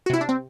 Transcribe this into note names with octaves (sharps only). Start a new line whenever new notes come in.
F#4
C3 E4
D4
C4